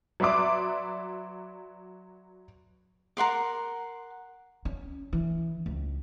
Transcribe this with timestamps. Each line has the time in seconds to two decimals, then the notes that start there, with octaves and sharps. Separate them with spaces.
0.20 F#3 B4 D5 E5 C6 D6
3.17 A#4 F#5 C6 D6
4.65 C#4
5.13 E3
5.66 C#2